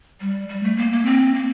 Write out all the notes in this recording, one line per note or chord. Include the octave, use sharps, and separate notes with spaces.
G3
G3
A3
A#3
A#3
C4
A#3